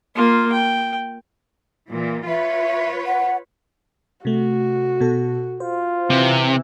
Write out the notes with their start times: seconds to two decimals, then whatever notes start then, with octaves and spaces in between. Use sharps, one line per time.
0.16 A#3 F4
0.52 G5
1.90 A#2 E3
2.28 F4 B4 C#5 E5
3.06 F#5
4.25 C3 A3 F#4
5.01 B2 A4
5.60 F4 C5
6.10 C3 E3